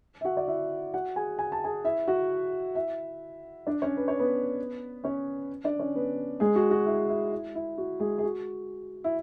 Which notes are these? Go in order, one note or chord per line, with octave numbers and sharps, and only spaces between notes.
E5
F#4 F#5
D5
E4 E5
F#4 F#5
G#4 G#5
G#5
A5
G#4 G#5
E4 E5
F#4 F#5
E4 E5
D4 D5
C#4 C#5
B4
C#5
B3 B4
C#4 C#5
D4 D5
C#4 C#5
B3 B4
G#3 G#4
F#4
F#4
E4
E4
E4
E4
F#4
G#3 G#4
G#4
F#4
E4